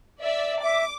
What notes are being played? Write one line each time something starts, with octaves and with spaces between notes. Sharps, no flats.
D5 E5
E5 D6